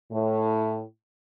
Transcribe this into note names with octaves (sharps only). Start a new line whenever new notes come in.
A2